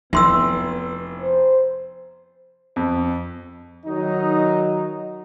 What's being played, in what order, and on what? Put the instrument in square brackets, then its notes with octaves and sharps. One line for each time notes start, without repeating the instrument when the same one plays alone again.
[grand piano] F1 [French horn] B3 [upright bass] E4 [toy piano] E5 C6 E6
[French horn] C5
[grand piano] F2
[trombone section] D#3 F#3 D#4